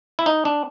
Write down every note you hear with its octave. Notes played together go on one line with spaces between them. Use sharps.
E4
D#4
D4